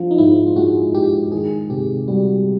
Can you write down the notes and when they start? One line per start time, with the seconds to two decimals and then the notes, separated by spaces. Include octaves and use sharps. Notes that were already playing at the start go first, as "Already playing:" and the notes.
Already playing: F3 D4
0.11 D#4
0.18 G#2 E4
0.47 F4
0.56 G#3 F#4
0.94 G#3 G4
1.32 D#3 G#4
1.70 C3 G4
2.08 G3 F#4